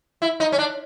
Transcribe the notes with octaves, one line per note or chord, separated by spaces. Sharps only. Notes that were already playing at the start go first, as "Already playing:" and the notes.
E4
D#4
C#4
D4